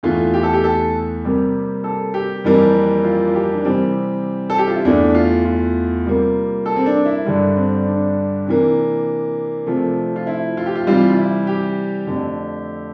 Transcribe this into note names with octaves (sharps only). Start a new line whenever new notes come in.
E2 E3 A3 F4
G4
A4
G4
A4
C3 G3 A#3
A4
G4
F2 E3 G3 A#3
F4
F4
G4
D4
C3 E3 G3 C4
A4
G4
F4
E4
E2 E3 A3 D4
F4
F4
C3 G3 A#3
A4
C4
D4
E4
G2 D3 G3
C4
D4
C3 E3 A#3
C3 F3 A3
F4
E4
F4
G4
F4
C3 E3 G3 F4
F4
E4
G4
F2 D3 A3